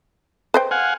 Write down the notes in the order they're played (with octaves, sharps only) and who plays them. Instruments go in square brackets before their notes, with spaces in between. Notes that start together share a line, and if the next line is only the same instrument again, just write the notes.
[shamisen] B4 C5 G5
[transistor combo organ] F5 F#5 G#5